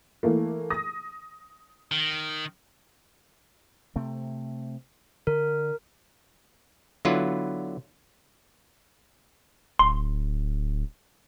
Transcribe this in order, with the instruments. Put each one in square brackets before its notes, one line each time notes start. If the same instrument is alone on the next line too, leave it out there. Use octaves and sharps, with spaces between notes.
[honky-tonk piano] E3 A3 A#3
D#6 A#6
[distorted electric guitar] D#3
[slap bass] C3 A3 C4
[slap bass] D3 [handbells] A#4
[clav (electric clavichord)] D3 F#3 B3 E4 F4 B4
[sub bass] D1 [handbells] C6